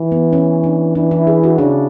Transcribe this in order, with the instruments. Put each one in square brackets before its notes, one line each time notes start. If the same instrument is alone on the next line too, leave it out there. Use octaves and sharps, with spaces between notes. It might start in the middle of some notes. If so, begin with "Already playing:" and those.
Already playing: [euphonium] E3
[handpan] B3
C#4
D4
[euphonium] E3 [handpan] D4
[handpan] E4
G#4
F#4
[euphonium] C#3 [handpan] D4